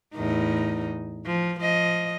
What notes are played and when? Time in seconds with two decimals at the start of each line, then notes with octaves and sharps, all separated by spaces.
0.15 E2 A2 D#4
1.26 F3
1.60 F3 D#5